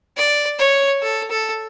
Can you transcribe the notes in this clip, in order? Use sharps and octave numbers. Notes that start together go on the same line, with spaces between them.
D5
C#5
A4
A4